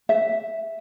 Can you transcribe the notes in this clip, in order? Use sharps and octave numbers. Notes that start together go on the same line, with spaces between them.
E5